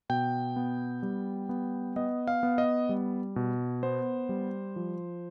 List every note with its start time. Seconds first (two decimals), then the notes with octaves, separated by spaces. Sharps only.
0.09 B2 G5
0.56 B3
1.03 G3
1.49 B3
1.96 B3 D#5
2.27 F5
2.43 B3
2.58 D#5
2.89 G3
3.36 B2
3.83 B3 C5
4.29 G3
4.76 F3